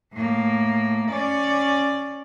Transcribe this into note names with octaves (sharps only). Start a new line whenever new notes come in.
A2 A#3
C#4 D5